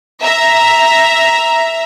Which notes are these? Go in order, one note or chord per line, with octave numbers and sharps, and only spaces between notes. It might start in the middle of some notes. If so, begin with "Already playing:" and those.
E5 A#5